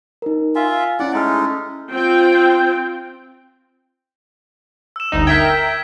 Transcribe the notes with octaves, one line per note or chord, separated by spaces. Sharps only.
D#4 A#4
F4 E5 F5 G#5
C#4 E4 D5 F#5
G#3 A3 D#4 F6 A6
C4 F4 G5
E6 E7
G1 D2 D#4
A#4 E5 G5 G#6 B6